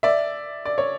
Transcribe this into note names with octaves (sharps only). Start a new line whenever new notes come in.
D5 E5
D5
C#5